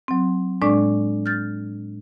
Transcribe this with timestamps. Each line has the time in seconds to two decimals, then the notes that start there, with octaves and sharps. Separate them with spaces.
0.08 F#3 C4
0.62 A2 G#3 D4 D5 C#6
1.26 F6 G6 A6